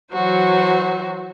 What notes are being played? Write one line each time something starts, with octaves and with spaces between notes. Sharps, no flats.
E3 F#3 F#4 C5